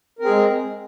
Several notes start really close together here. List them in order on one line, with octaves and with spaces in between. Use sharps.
A#4 C4 G#4 G#3